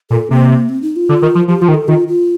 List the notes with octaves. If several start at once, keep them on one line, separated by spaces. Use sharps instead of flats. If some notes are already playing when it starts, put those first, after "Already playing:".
A#2 A4
C3 A#3
C4
D#4
F4
D3
D#3
F3
F3 G4
F3 F4
D#3
A4
D#3 F4
F4